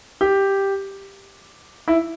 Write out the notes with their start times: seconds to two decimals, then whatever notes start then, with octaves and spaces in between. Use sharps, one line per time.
0.21 G4
1.88 E4